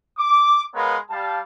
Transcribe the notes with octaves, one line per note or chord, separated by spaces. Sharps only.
D6
G#3 B3 A#4 B4 C#5 F5
G3 F5 A5